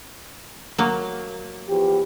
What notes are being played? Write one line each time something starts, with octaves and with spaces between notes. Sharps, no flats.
F#3 A#3
E2 F3 G4